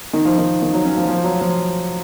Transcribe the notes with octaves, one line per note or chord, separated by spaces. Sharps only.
D#3
F3
D#3
D#3
F#3
C#4
F3
F3
F#3
F3